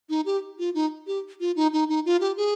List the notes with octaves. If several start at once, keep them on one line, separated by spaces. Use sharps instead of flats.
D#4
G4
F4
D#4
G4
F4
D#4
D#4
D#4
F4
G4
G#4